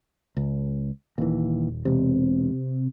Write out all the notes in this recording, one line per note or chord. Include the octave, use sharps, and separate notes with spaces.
C#2
D#1 D#2 E3
E1 C3